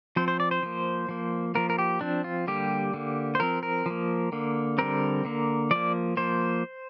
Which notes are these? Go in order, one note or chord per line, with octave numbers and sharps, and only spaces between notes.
F3 C4 C5
C5
D5
C5
F3 A#3
F3 A#3
F3 A#3 A#4
A#4
G4
F3 C4 D4
F4
D3 G3 A#3 G4
D3 A#3
C5
F3 C4 A#4
A#4
F3 A#3
D3 A#3
D3 G3 C4 A#4
D3 A#3
F3 A#3 D5
F3 A#3 C5